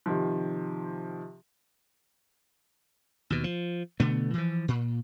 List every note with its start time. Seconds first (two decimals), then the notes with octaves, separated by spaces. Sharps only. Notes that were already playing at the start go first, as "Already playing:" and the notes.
0.06 C3 D#3 F3
3.30 D#2 B2
3.44 F3
4.00 B2 D3 A3 B3
4.34 E3 F3
4.68 A#2